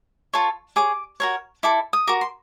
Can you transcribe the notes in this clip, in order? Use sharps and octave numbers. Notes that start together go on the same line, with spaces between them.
F4 A4 C#5 C#6
G#4 C#5 D6
F#4 A#4 C#5
E4 A4 D6
D#6
F#4 A#4 D6
C6